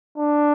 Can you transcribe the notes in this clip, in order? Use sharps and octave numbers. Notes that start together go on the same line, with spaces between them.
D4